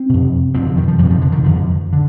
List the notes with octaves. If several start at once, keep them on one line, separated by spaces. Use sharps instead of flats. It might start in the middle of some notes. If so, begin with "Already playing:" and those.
Already playing: C4
F2 C3
F2 C3 C4
D3
D#3
F3
F2 C3 D#3 F3
F3
D3
D#3
F2 D3
D3